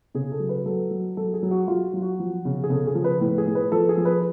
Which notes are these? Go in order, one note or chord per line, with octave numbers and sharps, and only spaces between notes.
C#3 G#4
A4
F#3
B4
F#3 A4
F#3
F#3 A4
G#4
F#3
F#4
F#3 F4
F#3
F#4
F3
C#3
G#4
C#3 A4
G#4
F3
B4
A2
G#4
A2
B4
F3 A4
G#4
F3
B4